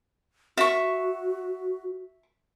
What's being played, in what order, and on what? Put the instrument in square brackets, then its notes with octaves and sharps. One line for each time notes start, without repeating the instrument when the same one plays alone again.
[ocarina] F#4 [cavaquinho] E5 C#6